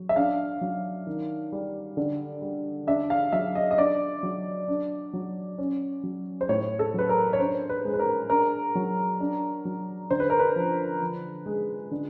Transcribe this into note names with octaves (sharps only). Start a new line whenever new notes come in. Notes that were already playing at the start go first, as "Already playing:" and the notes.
Already playing: F#3
E5
D4 F5
F#3
D#3
G3
D3
G3
D4 E5
F5
F#3 E5
D#5
D#5
D4 D5
F#3
D4
F#3
C#4
F#3
C5
A2 C#5
A4
F#3 B4
A#4
C#5
D4 C5
B4
G#3
B4
A#4
D4 A#4
F#3
D4
F#3
D3 C5
B4
A#4
B4
F3
F3
G#3
D3